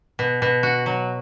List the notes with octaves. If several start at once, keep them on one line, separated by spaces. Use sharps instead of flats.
B2
B2
F#4
F#3